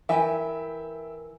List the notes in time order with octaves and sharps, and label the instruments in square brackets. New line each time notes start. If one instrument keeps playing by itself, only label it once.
[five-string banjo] E3 [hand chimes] A#4 G#5 [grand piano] E5 G5